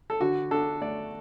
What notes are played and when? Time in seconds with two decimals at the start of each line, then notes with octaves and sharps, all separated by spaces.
0.10 A4
0.20 D3 F#4
0.51 D4 A4
0.82 A3 D5